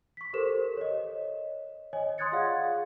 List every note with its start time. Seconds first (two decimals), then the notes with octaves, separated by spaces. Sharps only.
0.17 C#6 B6
0.33 G4 A4 A#4 C5 E7
0.77 C#5 D#5
1.93 C#5 D#5 G#5
2.18 C6 D#6 F#6 G#6 A6 C#7
2.32 F4 G#4 D5 F5 F#5